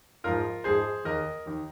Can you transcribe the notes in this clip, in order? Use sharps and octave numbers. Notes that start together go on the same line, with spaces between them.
A#1 G#2 F3 F4 A#4
A#1 G#2 F3 G#4 C5
D#2 D#3 A#4 D#5
D#2 D#3